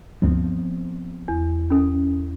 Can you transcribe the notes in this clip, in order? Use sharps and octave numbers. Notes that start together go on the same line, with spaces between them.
D2 G2 F3 B3 C4
E2
C#4 A4